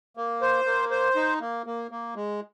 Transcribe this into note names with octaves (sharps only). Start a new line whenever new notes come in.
A#3
C5
A#3
C5
D#4
A#3
A#3
A#3
G#3